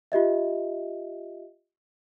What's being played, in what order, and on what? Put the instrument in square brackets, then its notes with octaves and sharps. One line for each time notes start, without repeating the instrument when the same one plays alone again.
[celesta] F4 G4 D#5 E5